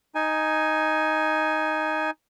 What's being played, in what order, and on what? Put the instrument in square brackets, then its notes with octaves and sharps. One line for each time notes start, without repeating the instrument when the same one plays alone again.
[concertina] D#4 G#5